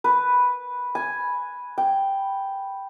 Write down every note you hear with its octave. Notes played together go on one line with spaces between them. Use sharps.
B4
G#5
G5